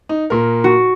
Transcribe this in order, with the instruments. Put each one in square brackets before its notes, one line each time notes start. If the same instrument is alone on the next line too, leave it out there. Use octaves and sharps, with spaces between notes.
[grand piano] D#4
A#2 A#4
[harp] F#4